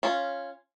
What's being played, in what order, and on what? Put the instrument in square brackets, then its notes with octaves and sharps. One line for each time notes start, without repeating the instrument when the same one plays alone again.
[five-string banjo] C#4 F4